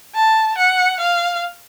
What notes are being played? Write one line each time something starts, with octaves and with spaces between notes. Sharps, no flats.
A5
F#5
F5